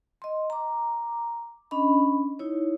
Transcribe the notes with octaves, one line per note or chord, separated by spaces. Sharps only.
D#5 C6
A#5 D6
C#4 D4 D#5 B5
D#4 E4 C#5